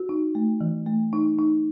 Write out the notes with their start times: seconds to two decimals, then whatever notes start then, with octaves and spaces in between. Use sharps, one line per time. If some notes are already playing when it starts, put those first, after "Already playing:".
Already playing: F#4
0.09 D#4
0.35 A3
0.61 E3
0.86 A3
1.13 D#4
1.39 D#4